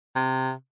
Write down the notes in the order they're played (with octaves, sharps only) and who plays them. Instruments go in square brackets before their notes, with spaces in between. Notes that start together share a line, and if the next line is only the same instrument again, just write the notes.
[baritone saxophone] C3